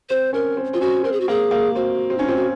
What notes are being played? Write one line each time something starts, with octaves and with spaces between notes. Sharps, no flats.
C4 C5
C#4 A#4
C4
C4 F4
C#4 F#4
C4 A#4
G#4
F#4
A#3 G#4
A#3
C4 F#4
C4
C#4 D#4
C4 F4
F#4